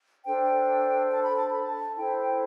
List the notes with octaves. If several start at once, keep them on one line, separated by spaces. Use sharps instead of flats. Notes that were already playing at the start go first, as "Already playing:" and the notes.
D4 A4 C5 G5
A5
B5
A5
B5
A5
E4 A4 C5 G5
G5